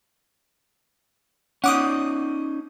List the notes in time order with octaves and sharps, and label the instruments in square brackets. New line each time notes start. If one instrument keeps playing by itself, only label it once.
[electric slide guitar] C#4 D#4 [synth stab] F#5 D6 D#6